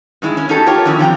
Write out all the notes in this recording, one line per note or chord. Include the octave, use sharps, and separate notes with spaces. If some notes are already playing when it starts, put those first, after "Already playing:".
G2 D#3 G#3 E4
C#4 E4
A2 C#4 D#4 F#4 G4 A4
F4 G4 A#4 C#5
F2 D3 D#3 C#4 E4
C3 F3 G5 A#5